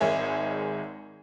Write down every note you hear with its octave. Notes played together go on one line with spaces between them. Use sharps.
G#1 D#3 G#3 G#4 C#5 E5